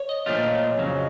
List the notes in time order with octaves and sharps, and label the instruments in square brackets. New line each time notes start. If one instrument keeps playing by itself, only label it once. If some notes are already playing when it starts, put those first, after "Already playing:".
Already playing: [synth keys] C#5
D#5
[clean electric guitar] A#2 F3 A3 D4 F4
F2 C#3 F#3